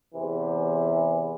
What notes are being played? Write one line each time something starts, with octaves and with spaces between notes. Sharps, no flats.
E2 C3 E3